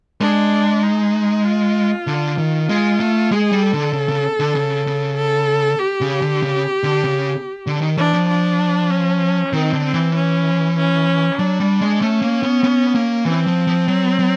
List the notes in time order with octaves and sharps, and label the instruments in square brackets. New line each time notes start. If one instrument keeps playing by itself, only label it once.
[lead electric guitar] G#3 [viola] D4
[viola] D#4
F4
[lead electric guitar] D3
D#3
[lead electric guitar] G#3 [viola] F4
[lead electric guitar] A3
[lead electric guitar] G#3 [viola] G#4
[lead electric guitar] G3
[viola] A4
[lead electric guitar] D3
C#3
C#3
D3
C#3
C#3
[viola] A4
G4
[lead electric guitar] C#3
D3
C#3
D3
C#3
D3
D#3
[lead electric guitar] E3 [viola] D4
[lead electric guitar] F3
[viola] D4
C#4
[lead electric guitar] D#3 [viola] C4
[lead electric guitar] D3
[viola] C4
[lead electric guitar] E3
[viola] C#4
C#4
[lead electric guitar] F#3 [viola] D4
[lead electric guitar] G3
G#3
[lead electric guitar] A3 [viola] C#4
[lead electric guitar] A#3
B3
B3
A#3
[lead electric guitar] E3 [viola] C4
[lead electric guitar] F3
F3
F#3
F#3